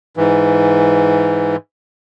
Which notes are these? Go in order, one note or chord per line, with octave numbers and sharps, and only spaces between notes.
G#2 E3